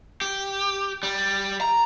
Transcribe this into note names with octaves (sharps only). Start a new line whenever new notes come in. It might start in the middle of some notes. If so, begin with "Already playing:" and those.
G4
G3
A#5